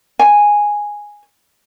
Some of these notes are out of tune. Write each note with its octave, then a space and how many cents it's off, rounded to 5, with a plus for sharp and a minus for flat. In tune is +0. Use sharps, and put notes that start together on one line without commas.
G#5 -5